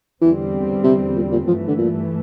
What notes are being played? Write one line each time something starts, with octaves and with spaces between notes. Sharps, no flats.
E2 D3 E3 G3 C4
C3
A#2
A#2
G2 E3 F3 A3
D3
A#2